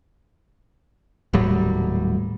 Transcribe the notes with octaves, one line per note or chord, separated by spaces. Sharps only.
D#1 A2 F#3 G3